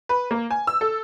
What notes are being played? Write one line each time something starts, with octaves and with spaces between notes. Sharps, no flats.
B4
A#3
G#5
E6
A4